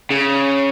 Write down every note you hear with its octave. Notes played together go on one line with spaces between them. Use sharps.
C#3